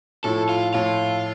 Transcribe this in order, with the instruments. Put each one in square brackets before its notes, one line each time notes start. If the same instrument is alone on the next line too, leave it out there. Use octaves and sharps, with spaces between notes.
[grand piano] A2 F3 A3 E4 [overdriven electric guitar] A4
[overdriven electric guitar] F4
[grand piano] A2 F3 A3 E4 [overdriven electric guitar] F4